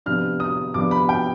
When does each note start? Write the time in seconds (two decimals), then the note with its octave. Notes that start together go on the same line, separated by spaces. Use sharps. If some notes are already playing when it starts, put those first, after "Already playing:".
0.06 C3 F3 B3 D4 F6
0.40 D#6
0.74 C3 F3 B3 D4 D6
0.91 B5
1.09 G5